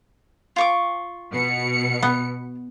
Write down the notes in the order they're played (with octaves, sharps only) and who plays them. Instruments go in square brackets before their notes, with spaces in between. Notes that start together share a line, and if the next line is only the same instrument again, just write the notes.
[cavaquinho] F4 C#6 D6
[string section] B2 C#7
[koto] B3